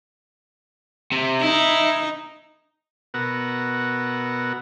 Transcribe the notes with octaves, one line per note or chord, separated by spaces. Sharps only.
C3
D#4 E4
B2 B3 F#4 A#4 F#5 E6